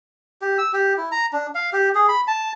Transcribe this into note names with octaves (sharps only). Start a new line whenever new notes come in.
G4
E6
G4
E4
A#5
D4
F5
G4
G#4
B5
A5